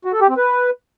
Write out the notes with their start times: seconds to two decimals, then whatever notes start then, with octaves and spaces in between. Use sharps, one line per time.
0.05 F#4
0.13 A4
0.21 G4
0.29 C4
0.37 B4